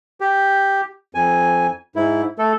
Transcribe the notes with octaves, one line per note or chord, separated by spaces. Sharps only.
G4
F2 G#5
G#2 E4
A3 A4